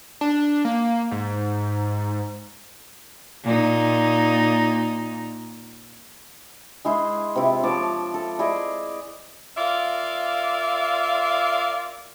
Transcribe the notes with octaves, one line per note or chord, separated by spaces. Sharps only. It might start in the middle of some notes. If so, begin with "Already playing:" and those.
D4
A#3
G#2
A#2 D#4
G#3 E4 G#4 C5
C3 E4 F4
F3 C#5 A5 D6
A4
E4 G#4 D5 D#5
F4 A#4 D5 E5 F5